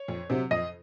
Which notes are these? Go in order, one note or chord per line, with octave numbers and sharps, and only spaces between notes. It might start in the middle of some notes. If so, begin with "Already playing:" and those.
Already playing: C#5
F2
C3 F#3 C4
F2 D#5